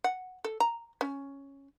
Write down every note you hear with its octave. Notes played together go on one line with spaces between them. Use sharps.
F#5
A4
A#5
C#4